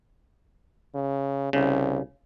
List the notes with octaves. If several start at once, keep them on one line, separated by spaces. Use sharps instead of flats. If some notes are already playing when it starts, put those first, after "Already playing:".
C#3
C2 C#3